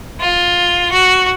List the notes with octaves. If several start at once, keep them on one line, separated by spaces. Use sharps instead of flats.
F4
F#4